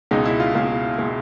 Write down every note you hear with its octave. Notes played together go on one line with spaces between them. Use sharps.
C#2 B2 G#3 D#4
E4
F4
C#2 B2 G#3 F4
B2 G#3